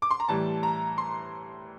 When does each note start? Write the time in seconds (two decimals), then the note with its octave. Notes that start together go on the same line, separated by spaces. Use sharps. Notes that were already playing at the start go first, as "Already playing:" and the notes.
0.02 D6
0.11 C6
0.20 A#5
0.28 A2 E3 G3 A5
0.63 A#5
0.98 C6